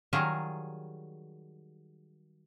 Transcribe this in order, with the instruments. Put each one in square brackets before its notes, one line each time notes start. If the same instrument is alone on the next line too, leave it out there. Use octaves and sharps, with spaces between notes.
[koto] D#3 F#3 G3 F4 G#4 A#4